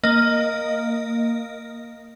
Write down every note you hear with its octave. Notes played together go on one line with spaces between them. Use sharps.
A#3 D#5